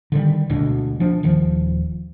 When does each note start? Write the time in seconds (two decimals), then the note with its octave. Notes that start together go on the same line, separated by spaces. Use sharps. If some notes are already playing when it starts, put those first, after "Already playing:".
0.12 D3 D#3 G3
0.50 D2 B2 G#3 D4
1.00 F3 D4
1.23 D#1 D#3 F3